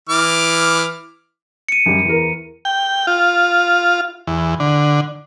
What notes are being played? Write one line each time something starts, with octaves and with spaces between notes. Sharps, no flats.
E3 D6 F6
C#7 D#7
F#2 G3
E2 A#4
G5
F4
E2
D3